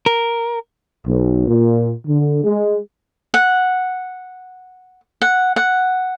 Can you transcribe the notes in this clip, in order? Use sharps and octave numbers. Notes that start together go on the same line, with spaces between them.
A#4
B1
A#2
D3
G#3
F#5
F#5
F#5